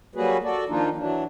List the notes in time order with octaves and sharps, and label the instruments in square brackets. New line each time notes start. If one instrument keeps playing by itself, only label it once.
[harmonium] F#3 G3 A#3 F#4 G#4 B4
F#4 A4 D5
D#3 F3 A#3 D4 D#4 F4
E3 F#3 D4